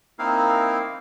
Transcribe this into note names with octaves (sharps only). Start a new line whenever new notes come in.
A#3 C4 D#4 E4 A#4 F5